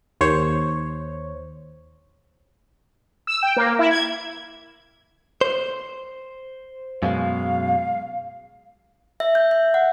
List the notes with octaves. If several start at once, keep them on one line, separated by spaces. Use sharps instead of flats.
D#2 C5 C#5
E6
G5
A#3
E4
G#6
C5
F#2 B2 G#3 F5
E5
G6
E5
F#5